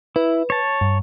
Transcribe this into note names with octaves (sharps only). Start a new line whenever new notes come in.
E4 B4
C#5 A5
G2